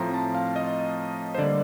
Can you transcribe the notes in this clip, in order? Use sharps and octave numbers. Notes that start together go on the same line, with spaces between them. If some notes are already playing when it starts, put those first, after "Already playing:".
Already playing: A2 F3 A3 C4 A#5 C6
A5
F5
D#5
C5
D3 G3 A#3 D5